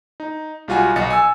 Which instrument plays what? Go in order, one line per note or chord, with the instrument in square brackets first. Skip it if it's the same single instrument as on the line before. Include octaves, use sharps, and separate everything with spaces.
[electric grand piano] D#4
B1 G3 F4 F#4 G#5
B1 D#5 A6 C#7
G#5 E6